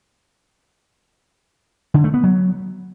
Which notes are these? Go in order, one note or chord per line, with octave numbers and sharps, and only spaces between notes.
D3
A3
B3
F#3